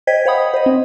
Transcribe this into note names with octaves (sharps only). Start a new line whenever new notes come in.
C5 D#5 G5 G#6 B6
C5 F5 F#5 B5 D#6
C5 D#5
C4